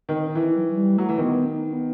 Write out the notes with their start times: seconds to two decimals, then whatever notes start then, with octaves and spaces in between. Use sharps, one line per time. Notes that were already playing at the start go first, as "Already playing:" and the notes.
0.09 D#3 C4
0.28 D#4
0.35 E3 E4
0.57 F#3
0.69 F#3
0.77 G3
0.97 F#3 A3
1.09 E3
1.18 D#3 B3
1.46 D#4
1.73 B3